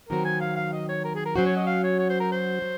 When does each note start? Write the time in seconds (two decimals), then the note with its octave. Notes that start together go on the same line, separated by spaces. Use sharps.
0.09 D#3 F#3 C4 F#4 A#4
0.25 G#5
0.41 F5
0.56 F5
0.73 D#5
0.89 C#5
1.04 A#4
1.15 G#4
1.25 A#4
1.36 F#3 C#4 F#4 C5
1.46 C#5
1.56 D#5
1.67 F5
1.84 C#5
1.99 C#5
2.10 C5
2.20 A#4
2.32 C5
2.62 F#3